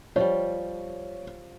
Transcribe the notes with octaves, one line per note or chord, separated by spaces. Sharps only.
F3 G3 C#5